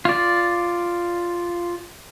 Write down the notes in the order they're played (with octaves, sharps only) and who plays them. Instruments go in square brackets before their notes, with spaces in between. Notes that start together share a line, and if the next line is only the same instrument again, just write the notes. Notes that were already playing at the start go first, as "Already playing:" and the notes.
[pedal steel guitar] F4 D5